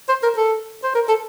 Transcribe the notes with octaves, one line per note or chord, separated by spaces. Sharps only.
C5
A#4
A4
C5
A#4
A4